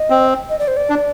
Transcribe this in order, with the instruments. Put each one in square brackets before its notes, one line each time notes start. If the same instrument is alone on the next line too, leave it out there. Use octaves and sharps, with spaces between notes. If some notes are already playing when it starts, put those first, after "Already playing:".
Already playing: [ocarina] D#5
[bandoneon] C4
[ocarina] D#5
D5
C5
D5
[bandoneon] D4